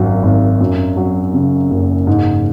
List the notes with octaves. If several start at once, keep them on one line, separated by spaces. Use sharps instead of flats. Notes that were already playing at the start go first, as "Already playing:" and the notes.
Already playing: G#1 F#2 F#3
G#1
F#2
F#3
C#3
F#1
G#2